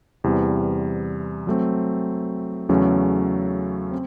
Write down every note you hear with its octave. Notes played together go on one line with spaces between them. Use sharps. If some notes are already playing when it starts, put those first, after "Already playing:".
E2 C3 E3 G3
F#3 A3 C4
E2 C#3 F#3 A3 C#4
C4